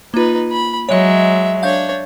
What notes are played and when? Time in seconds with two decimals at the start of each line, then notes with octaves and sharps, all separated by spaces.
0.14 A#3 D#4 F4 B4
0.52 B5
0.89 F#3 G#3 C#5 D#5 E5
1.63 D4 C#5 F5 G6